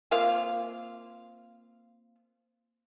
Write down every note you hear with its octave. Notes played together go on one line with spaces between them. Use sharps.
A#3 C4 F4 F5